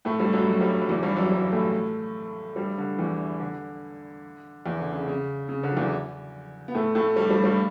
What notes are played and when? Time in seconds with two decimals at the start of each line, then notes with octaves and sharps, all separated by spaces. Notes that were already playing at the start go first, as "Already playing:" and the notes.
0.05 A2 A3
0.20 G2 G3
0.33 F#2 F#3
0.48 F#2 F#3
0.61 G2 G3
0.81 F#3
0.89 E2 E3
1.03 G2 G3
1.12 E3
1.16 F#2 F#3
1.32 G2 G3
1.52 A2 A3
2.56 G2 G3
2.78 D3
2.98 E2 E3
3.40 D3
4.66 E2 E3
4.80 D3
4.93 C#3
5.07 C#3
5.49 C#3
5.63 D3
5.72 F#3
5.76 E2 E3
6.68 B3
6.74 A2 A3
6.95 A2 A3
7.16 G2 G3
7.30 G2 G3
7.44 G2 G3